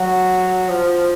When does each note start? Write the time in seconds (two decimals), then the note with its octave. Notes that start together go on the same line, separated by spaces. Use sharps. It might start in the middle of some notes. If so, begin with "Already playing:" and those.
Already playing: F#3
0.69 F3